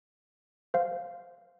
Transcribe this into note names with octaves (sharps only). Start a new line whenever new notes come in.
C5 F5